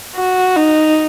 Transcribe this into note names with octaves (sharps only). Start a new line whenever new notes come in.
F#4
D#4